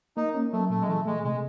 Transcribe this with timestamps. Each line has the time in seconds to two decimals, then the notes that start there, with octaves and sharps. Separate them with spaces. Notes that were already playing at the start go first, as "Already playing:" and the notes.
0.17 A#3 D#4
0.35 C#4
0.52 F#3 A3
0.70 A#2 A3
0.81 G#3
0.88 E3 A3
1.06 G#3 A3
1.24 C3 G#3